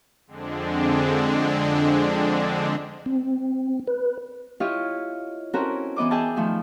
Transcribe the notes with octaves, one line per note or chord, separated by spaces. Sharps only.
F2 D3 G#3 C4 D4
C4
B4
E4 F4 G4 C#5 D#5
C4 C#4 E4 F#4 A4 A#4
E3 B3 D#5 D6
G#4 D#5 E5 G5 A5
D#3 F3 A3